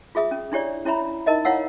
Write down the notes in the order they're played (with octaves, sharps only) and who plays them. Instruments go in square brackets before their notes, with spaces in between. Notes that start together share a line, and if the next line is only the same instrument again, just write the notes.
[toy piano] F4 G#4 E5 D#6
C#4
D4 E4 G4 C#5 D5
C#4 E4 C#5 E5 A#5 B5
D#4 A#4 D#5 E5
E4 C#5 F5 F#5 E6